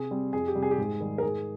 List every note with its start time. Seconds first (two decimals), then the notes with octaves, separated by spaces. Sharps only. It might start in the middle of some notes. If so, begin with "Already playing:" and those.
Already playing: C3 G#4
0.11 G3 C4
0.33 F2 G#4
0.48 G4
0.55 C3 G3
0.62 G#4
0.71 G4
0.78 G#2 G#4
1.00 D#3 G3
1.18 A#4
1.22 G#2 G#4